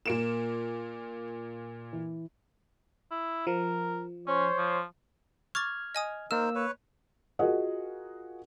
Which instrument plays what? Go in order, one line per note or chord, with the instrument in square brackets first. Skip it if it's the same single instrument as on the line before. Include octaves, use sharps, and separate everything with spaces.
[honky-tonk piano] A#2 A#3 E7 [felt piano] A#4 D7
[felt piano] E3
[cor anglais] E4
[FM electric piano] F3 [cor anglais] A#4
[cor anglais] C#4 [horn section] C5 C#5
[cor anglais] F3
[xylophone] C#6 D6 A6 [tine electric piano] F6 G#6
[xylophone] D#5 G#5 D#6
[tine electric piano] A#3 E6 [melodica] D#4 A#4 C5 [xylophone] F6
[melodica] B4 C#5
[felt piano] F4 F#4 G#4 A#4 D#5 F#5